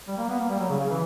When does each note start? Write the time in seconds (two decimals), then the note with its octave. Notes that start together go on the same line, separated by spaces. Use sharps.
0.08 G3
0.18 A#3
0.29 B3
0.39 A#3
0.49 G3
0.59 F#3
0.69 C#3
0.79 C#3
0.90 E3